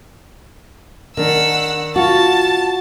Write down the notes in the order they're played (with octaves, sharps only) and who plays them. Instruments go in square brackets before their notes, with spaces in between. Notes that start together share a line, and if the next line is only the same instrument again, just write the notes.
[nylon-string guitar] D#3 D4 [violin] F#5 E6
[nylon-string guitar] F4 F#4 [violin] A5